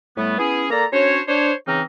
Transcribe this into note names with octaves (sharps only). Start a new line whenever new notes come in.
A2 G3 A3 B3
B3 C#4 E4 G#4
A#3 A4 D5 A#5
C#4 D4 F#4 C5 C#5
D4 C5 C#5
C#3 E3 C4 D#4 A#5 F6